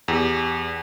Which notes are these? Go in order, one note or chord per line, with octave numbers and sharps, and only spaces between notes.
E2 G4